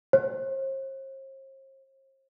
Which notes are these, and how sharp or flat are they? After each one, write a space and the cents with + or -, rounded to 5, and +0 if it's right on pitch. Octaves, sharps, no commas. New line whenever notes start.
C5 +45